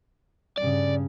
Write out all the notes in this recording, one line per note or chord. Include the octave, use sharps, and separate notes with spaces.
G2 C#3 D5